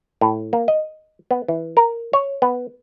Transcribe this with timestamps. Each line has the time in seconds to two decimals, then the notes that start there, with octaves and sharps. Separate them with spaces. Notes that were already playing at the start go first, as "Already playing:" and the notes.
0.21 A2
0.53 A#3
0.68 D#5
1.31 B3
1.48 E3
1.77 A#4
2.13 C#5
2.42 B3